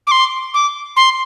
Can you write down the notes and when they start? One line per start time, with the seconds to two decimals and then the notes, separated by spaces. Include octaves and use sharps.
0.07 D6
0.11 C6
0.54 D6
0.97 C6